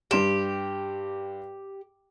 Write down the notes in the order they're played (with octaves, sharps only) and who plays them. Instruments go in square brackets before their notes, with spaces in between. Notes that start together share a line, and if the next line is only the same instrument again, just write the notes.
[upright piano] G2 C6 E7 [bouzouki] G4